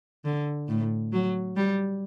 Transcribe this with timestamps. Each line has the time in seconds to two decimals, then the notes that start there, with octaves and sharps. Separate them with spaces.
0.25 D3
0.68 A2
1.13 F#3
1.56 G3